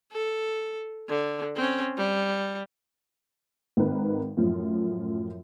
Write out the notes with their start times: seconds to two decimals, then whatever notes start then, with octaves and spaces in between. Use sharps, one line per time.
0.12 A4
1.09 D3
1.56 C4 C#4
1.97 G3
3.77 G#1 D#3 C4 A#4 B4
4.37 F#2 A2 F3 F4